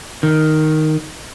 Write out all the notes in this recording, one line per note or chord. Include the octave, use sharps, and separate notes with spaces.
D#3